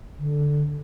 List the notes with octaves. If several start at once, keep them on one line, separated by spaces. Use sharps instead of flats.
D3